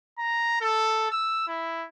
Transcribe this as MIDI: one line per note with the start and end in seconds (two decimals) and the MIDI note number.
0.18 0.57 82
0.61 1.08 69
1.11 1.46 88
1.47 1.86 64